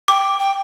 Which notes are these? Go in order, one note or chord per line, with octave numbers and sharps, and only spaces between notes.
G5 D6
G5